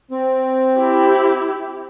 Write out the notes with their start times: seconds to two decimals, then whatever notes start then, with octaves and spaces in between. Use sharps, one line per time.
0.11 C4
0.76 E4 G4